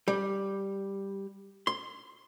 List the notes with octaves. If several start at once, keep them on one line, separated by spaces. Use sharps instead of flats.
G3
C6